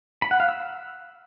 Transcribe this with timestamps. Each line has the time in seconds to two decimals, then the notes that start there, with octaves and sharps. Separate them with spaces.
0.22 B5
0.31 F#5
0.40 F5
0.49 E6